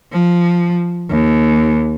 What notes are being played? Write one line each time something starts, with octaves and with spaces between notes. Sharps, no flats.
F3
D#2